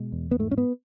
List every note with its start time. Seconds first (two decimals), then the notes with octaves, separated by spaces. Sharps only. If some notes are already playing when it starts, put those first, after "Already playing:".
Already playing: B2 G#3
0.12 E2
0.31 B3
0.39 G#2 A3
0.51 C#4
0.58 B3